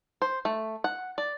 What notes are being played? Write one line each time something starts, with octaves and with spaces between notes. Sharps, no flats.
C5
A3
F#5
D5